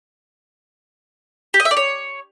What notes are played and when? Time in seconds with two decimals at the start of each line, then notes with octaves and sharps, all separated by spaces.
1.54 G4
1.60 D#5
1.65 E5
1.71 D5
1.77 C#5